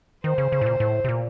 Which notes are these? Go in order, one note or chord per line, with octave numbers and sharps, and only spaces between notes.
D#3 C5
C#3
C#3
A2
A#2
A2
C3
A#2